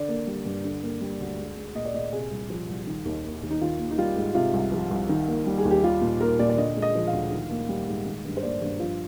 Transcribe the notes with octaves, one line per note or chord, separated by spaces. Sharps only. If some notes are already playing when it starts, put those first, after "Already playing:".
Already playing: D3 D5
A#3
G3
G2
D3
A#3
G3
D2
G#3
G#3
A#2 D#5
D5
A#2 D#5
C3 G#4
C2
F3
C2
D#3
D#2
A#3
D#2
D#4
D#3 F4
A#3
D#4
G3 F4
G#2
C3 F4
C2
F3
C2
D#3
A#3
G3
G#4
D#2
G4
G3 F4
A#2
A#3 A#4
A#2 D5
D5
D3 D#5
G#3
D#5
F3
F5
D2
D#3
A#3
G3
G#2
D#3
G2
C5
A#3 D5
G2
F3 F4